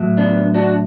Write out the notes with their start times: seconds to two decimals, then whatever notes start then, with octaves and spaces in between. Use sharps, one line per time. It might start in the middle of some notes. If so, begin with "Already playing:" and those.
Already playing: A2 F#3
0.17 B3 D4
0.54 D4 F#4